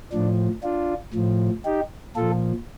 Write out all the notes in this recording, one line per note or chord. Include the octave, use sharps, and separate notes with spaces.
A2 F3 D4
D4 F4
A2 F3
D#4 G4
A#2 F3 F4 A4